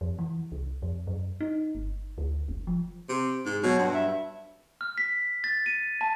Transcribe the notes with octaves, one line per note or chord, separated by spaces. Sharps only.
F2
E3
C2
F2
F#2
D#4
G1
D2
F1
F3
C3
G#2
B2 F#3
G2
E5
F6
B6
A6
D#7
A5